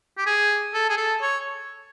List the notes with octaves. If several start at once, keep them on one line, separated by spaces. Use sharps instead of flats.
G4
G#4
A4
G#4
A4
C#5